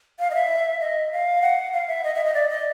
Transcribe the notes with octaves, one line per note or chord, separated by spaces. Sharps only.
F5
D#5
E5
D#5
F5
F#5
F5
E5
D#5
E5
D#5
D5
D#5